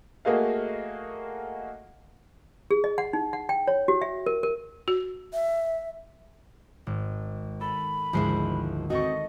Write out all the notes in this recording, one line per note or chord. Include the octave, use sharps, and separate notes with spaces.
A3 A#3 F#4 G#4 D#5 F5
G#4
D#5
F#5
D#4
F#5
G5
C#5
F#4
E5
A#4
A#4
F#4
E5
G#1
A4 B5
G#1 D2 F3 G#3 E4 C7
C4 D#4 F#4 A4 D#5 C#6